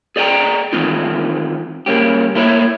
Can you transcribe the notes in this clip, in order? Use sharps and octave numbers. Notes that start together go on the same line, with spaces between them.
G#4 D5 D#5 F5 G5 A#5
D#3 E3 A3 C4 D#4 F4
C#3 G3 A#3 C#4 G4
A3 A#3 E4 C#5 D#5 E5